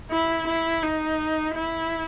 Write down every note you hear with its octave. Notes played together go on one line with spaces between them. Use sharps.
E4
E4
D#4
E4